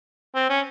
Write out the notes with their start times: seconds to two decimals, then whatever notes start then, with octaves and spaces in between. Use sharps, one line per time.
0.35 C4
0.50 C#4